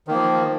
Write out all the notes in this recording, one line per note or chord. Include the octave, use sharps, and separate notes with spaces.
D#3 F3 A#3